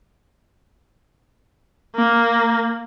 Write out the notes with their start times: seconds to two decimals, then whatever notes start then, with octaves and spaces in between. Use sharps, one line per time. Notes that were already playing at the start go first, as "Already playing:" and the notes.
1.96 A#3